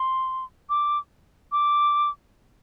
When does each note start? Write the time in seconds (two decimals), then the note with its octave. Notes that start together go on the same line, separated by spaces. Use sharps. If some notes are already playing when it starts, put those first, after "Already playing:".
Already playing: C6
0.69 D6
1.52 D6